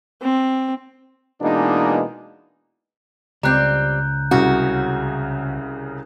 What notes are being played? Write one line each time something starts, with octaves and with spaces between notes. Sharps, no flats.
C4
B2 E3 G#3 A#3 D4 D#4
C#2 G3 C4 A#5 F#6 G6
C2 C#3 F#4